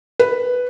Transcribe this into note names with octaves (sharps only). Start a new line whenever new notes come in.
B4